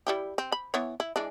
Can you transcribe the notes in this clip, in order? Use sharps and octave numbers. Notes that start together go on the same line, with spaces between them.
G3 E4 G4
C4
B5
E3 B3 C#5
E4
E3 G#3 D4